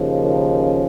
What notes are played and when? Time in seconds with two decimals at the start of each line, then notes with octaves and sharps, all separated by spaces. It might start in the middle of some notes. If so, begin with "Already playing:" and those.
Already playing: D#2 C#3 F3
0.23 D#3 D#4
0.52 C#4